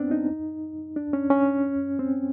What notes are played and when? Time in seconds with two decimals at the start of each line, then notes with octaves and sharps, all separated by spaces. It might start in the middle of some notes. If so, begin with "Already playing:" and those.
Already playing: B3 C4 D4
0.11 D#4
0.96 D4
1.13 C#4
1.30 C#4
1.99 C4